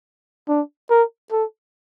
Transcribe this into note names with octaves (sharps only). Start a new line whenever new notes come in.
D4
A#4
A4